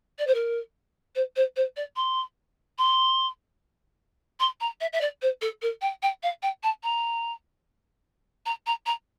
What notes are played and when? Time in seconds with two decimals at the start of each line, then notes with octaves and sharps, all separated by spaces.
0.19 D5
0.27 C5
0.34 A#4
1.15 C5
1.36 C5
1.56 C5
1.76 D5
1.96 C6
2.78 C6
4.40 C6
4.60 A#5
4.81 E5
4.93 E5
5.01 D5
5.22 C5
5.41 A4
5.62 A#4
5.81 G5
6.02 G5
6.23 F5
6.42 G5
6.63 A5
6.83 A#5
8.45 A#5
8.66 A#5
8.86 A#5